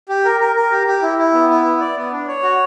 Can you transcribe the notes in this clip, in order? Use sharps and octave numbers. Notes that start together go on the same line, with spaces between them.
G4
A#4
A#4
A#4
G4
G4
E4
E4
B3
E4
B3
D5
B3
D4
C#5
F#4